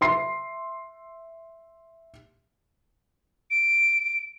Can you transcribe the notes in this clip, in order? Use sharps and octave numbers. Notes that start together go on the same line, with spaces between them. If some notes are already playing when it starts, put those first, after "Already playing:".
E5 C6 C7
D7